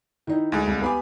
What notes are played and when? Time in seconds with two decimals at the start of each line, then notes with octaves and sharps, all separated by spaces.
0.27 D#3 D#4 E4
0.52 D2 G#3
0.67 C2
0.82 B3 G4 F5 G#5 B5 D6